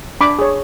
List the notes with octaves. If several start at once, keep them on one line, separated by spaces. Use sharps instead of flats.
D4 B5 D6
G#4 C#5